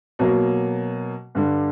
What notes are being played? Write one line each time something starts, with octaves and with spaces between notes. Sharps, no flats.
B2 F#3 A#3
G2 D3 G3